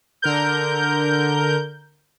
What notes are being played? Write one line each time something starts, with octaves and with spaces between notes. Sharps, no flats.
D3 A#4 G6